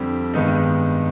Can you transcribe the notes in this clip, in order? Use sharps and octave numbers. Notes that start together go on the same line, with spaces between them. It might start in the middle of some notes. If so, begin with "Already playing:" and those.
Already playing: F2 D3 G3 C4
G2 D#3 G#3 B3 D#4